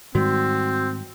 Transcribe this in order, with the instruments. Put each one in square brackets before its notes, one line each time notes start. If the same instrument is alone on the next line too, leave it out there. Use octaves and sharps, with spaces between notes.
[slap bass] G#2 D#3 G3 [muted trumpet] C4 [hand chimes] F#4